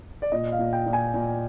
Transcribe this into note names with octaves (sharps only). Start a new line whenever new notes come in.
D5
A#2 D#5
F5
A#2
G5
A#2
G#5
A#2